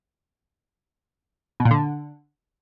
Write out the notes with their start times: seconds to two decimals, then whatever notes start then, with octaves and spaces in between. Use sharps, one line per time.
1.60 B2
1.65 A#2
1.71 D3